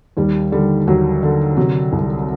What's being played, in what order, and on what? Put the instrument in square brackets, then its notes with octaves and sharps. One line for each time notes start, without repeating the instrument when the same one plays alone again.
[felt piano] D#2 G3
D3 G3
D#2 F#3
D3
C3 F#3
C2